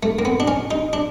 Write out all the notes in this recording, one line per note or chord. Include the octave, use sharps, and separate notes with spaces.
A3
A#3
B3
D4
C#4
D#4
D4